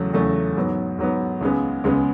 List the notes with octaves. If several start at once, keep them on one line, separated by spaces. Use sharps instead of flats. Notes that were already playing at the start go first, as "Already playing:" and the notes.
Already playing: E2 C#3 F#3 A3
E2 C#3 F#3 A3
G#2 F#3 B3
G#2 F#3 B3
C#2 C#3 G#3 B3
C#2 C#3 G#3 B3